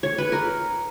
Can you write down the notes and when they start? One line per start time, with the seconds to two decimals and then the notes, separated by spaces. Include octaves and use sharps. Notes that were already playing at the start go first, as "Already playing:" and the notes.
0.03 C#5
0.18 B4
0.32 A#4